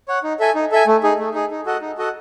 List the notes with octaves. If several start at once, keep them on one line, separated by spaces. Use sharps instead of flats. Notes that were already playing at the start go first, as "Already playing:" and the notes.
C#5 F#5
D#4
A4 E5 G#5
D#4
A4 E5 G#5
A3
D#4 G#4
A3
D#4 G#4
D#4
F#4 A4 D#5 F#5
D#4
F#4 A4 D#5 F#5